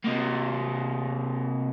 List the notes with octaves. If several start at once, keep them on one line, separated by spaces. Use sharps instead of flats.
C3 A#3